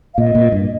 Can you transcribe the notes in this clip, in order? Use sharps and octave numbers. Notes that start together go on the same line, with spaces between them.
F5
A#2 D#5
A#2
G2